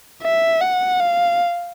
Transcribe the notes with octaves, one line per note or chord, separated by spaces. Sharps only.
E5
F#5
F5